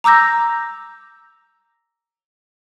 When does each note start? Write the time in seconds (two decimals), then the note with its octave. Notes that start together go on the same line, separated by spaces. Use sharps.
0.04 A#5 D6 E6 G6 A#6